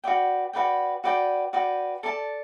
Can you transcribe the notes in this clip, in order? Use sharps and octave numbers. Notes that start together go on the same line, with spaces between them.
F#4 B4 D5 G5
F#4 B4 D5 G5
F#4 B4 D5 G5
F#4 B4 D5 G5
A4 D5 A5